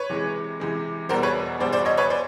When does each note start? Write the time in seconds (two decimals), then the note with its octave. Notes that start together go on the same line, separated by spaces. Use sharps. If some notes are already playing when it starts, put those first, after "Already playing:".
Already playing: B4 C#5
0.10 C3 E3 G#3
0.60 C3 E3 G#3
1.09 E2 B2 G3 A#4 C5
1.23 B4 C#5
1.60 E2 B2 G3 C5 D5
1.72 C5 D5
1.85 C#5 D#5
1.97 B4 C#5
2.10 C5 D5